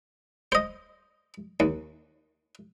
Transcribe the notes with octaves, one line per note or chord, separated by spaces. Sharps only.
C5 D#5
D#2